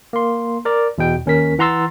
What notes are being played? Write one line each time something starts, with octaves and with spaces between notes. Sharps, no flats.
A#3 C6
A#4 D5 A#5
E2 B2 G5
D#2 C#4 A#4 B6
E3 F#5 A#5 C6 E6 A6